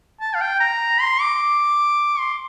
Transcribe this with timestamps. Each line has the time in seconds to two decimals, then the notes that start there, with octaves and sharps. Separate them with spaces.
0.21 A5
0.35 F5
0.42 G5
0.60 A#5
1.01 C6
1.21 D6
2.19 C6